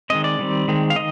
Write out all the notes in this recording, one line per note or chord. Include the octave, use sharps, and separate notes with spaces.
D#3 G#3 C4 D#5
D5
D#3 G3 C4
D#3 G#3 C4
F5
D#3 D#5